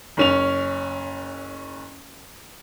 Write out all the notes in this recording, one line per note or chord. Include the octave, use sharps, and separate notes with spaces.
F#1 C#4 F7